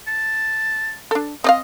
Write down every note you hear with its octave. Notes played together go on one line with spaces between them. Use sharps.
A5
D4 A4
C4 D5 D#5 F5